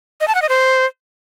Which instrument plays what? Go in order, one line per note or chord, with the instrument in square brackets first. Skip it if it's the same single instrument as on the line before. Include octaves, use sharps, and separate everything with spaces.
[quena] D#5
A5
F#5
D#5
C5